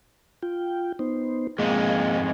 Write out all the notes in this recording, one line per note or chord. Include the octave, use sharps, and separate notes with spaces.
F4 G5
B3 D#4 C5
F2 G#2 G#3 A#3 G#4 F5